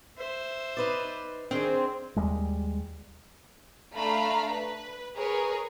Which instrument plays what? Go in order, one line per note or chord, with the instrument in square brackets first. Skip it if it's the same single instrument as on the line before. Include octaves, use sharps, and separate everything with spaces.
[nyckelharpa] C5 E5
[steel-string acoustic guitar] D#4 B4 D5
[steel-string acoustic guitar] D#3 [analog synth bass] C4 [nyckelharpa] D4 G#4
[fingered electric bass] D#2 G3 G#3
[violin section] A3 D4 F5 A#5 B5
B4
G#4 A#4 B4 C#5